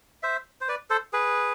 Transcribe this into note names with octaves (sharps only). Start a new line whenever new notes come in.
C5 E5
C5
B4 D5
A4 C5
G#4 B4